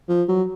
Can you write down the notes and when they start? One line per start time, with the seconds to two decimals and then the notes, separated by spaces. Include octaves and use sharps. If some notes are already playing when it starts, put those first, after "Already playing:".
0.09 F3
0.28 F#3